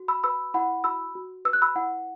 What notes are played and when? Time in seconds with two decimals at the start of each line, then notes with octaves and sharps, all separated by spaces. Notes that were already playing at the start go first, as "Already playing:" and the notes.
Already playing: F#4
0.08 B5 E6
0.23 B4 B5 E6
0.54 E4 F#5 B5
0.84 F#4 B5 E6
1.15 F#4
1.45 B4 E6
1.53 F#6
1.62 B5 E6
1.76 E4 F#5